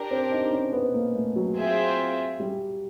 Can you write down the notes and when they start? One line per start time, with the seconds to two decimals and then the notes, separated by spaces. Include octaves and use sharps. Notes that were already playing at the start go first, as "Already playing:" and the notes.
Already playing: D4 G4 A#4
0.11 C4
0.31 D#4
0.53 C#4
0.73 B3
0.94 A#3
1.15 A3
1.36 F#3
1.56 C4 F4 G#4 C5 E5
2.40 G3